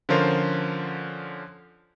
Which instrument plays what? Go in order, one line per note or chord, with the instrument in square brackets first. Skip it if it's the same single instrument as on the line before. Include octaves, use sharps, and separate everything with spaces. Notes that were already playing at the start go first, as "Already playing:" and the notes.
[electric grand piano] D3 F3 C#4 F4 A#4 C5